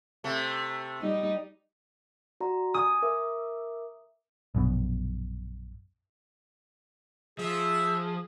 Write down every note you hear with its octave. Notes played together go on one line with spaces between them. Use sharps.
C3 A3
G3 D#4
F#4 D5 A#5
G#5 D#6
A#4 E5 D6
A#1 F#2 B2
F3 G#4 E5